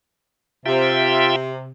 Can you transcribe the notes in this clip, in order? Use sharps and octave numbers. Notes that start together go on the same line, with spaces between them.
C3 F4 E5 G5